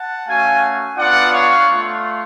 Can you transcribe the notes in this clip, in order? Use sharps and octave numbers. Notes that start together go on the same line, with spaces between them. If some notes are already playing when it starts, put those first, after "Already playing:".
Already playing: F#5 A5
A3 C#4 F#4 F5 G#5
B3 D4 F4 D5 F#5
C#5 F5
A3 F4